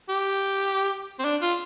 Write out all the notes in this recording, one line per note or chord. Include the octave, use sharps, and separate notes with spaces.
G4
C4
D4
F4